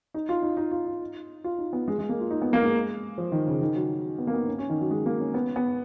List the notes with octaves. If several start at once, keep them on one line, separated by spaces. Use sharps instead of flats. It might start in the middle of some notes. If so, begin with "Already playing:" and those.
D#4
F4
D#4
D#4
F4
D#4
F4
D#4
B3
G#3
G#3
A#3
F4
D#4
B3
A#3
G#3
F3
D#3
C#3
D#3
F#3
B3
A#3
B3
C#4
C#4
D#3
F#3
G#3
A#3
C#4
B3
B3